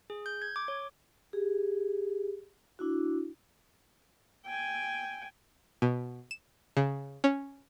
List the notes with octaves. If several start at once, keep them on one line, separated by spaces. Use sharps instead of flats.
G#4
G6
G#6
D6
C#5
G4 G#4
D4 E4 F#4
G5 G#5
B2
E7
C#3
C#4